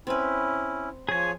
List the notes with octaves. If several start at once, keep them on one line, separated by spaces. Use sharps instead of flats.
C4 C#4 E4 B4
F3 G#4 C#5 G#5